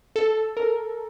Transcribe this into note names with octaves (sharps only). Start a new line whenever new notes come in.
A4
A#4